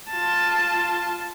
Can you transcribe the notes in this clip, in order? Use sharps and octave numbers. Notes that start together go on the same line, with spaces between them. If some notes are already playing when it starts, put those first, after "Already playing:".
F4 A5